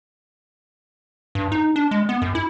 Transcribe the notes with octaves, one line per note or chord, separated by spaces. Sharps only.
G2
D#4
D4
G#3
B3
F#2
E4